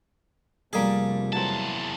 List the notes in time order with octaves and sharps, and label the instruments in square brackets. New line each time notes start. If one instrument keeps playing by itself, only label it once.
[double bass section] F1 C3 F3 [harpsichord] G3 A4 [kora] A#3 G#4
[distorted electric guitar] E2 A5 [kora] E3 F#3 C4